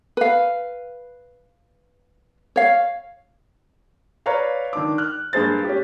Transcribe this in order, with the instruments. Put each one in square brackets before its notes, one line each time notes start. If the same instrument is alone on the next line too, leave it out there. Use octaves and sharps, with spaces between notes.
[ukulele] B4 F5
C#5 F5
[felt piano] B4 C#5 D5 F5 A#5
D#3 D4 D6
F6 F#6
G2 A#3 G#4 C5 A6
C#4 G4